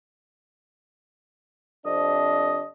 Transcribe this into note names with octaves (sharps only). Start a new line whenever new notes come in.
F2 C3 D4 D#5